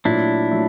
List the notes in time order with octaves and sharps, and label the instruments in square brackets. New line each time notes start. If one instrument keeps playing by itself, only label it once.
[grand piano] A#2 F#3 A3 [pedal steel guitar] D4 E4
[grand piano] F#3 A3